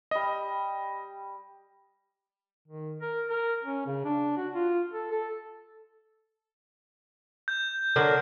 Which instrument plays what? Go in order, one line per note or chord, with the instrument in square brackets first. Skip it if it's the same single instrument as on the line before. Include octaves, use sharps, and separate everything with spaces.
[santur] G3 D#6 [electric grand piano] D#5
[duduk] D#3
A#4
A#4
C#4
C#3
D4
F#4
F4
A4
A4
[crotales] G6
[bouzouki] D3 F#3 A#4